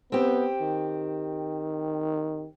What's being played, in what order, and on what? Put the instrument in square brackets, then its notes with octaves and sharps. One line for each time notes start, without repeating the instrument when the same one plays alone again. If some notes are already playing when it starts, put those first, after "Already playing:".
[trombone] B3 [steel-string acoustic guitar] C4 G4
[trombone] D#3